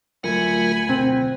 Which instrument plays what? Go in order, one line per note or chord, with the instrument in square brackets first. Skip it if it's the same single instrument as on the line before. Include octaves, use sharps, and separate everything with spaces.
[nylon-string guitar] D2 A3 [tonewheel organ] F#3 F4 A#4 [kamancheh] G#5 B5
[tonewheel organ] B2 [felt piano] C4